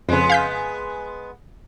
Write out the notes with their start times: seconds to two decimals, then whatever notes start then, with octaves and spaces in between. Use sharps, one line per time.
0.09 F2 C#3 G#3 B3
0.30 F5 G6 B6